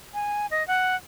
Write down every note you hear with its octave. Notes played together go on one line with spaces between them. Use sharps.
G#5
D#5
F#5